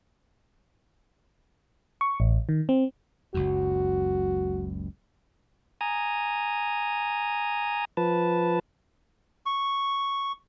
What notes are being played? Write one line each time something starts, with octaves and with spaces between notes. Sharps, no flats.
C#6
A1
D#3
C4
F#1 C#2 F#2 F#4
G#5 A#5 D#6
F3 B4 A5
C#6